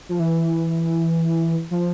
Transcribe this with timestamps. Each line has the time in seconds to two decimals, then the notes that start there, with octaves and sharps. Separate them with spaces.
0.09 F3
0.19 E3
1.71 F3